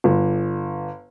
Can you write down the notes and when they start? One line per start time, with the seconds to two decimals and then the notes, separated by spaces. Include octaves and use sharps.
0.04 G1